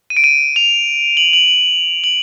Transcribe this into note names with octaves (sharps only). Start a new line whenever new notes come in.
D#7
D7
D#7
F7
F#7
F#7
F#7
F#7